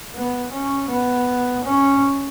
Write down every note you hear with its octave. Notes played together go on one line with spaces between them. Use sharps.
B3
C#4
B3
C#4